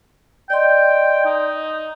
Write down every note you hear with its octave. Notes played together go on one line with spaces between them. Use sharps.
D5 D#5 G5 C6
D#4